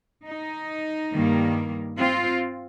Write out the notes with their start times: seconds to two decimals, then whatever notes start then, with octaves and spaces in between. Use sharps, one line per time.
0.25 D#4
1.12 G2 D#3 G3 A#3
1.98 C4 F4